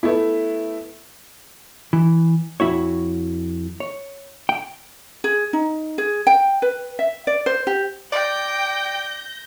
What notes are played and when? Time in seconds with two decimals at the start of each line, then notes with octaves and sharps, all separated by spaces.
0.03 A3 B3 E4
1.93 E3
2.60 F2 E4 F#4 C#5
3.80 C#5
4.49 G5
5.24 G#4
5.53 D#4
5.98 G#4
6.27 G5
6.62 B4
6.99 E5
7.27 D5
7.46 C5
7.67 G4
8.12 D5 G5 G6 A#6